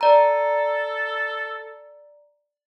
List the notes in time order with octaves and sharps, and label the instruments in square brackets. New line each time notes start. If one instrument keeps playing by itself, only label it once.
[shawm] A4 [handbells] D5 A#5